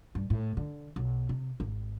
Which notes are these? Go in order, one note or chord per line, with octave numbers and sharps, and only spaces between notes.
G2
A2
D3
B1
C3
G#1